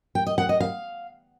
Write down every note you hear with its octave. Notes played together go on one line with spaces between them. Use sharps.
G5
D#5
F#5
D#5
F5